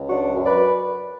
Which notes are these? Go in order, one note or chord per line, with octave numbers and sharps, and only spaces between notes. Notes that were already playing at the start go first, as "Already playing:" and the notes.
Already playing: C#2
F#3 D4 F#4
F#2
B4 D5